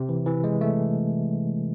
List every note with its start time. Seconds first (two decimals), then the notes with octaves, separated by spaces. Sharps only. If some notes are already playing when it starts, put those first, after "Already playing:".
Already playing: C3
0.09 E3
0.26 E3
0.44 G#3
0.61 A3